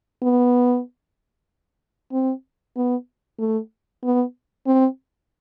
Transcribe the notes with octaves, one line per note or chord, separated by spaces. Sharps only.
B3
C4
B3
A3
B3
C4